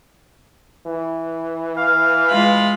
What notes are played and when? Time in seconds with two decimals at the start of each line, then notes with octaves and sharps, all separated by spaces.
0.86 E3
1.77 F5
2.30 G#3 F4 B5